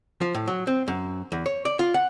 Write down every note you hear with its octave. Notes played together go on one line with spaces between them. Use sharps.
F3
A2
F#3
C4
F#2
E2
C#5
D5
F4
F#5